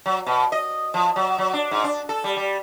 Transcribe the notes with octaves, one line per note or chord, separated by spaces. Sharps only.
F#3
B2
D#5
F3
F#3
F#3
D4
G#2
D4
A4
G3
G3